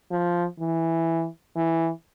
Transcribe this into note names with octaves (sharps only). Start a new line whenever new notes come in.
F3
E3
E3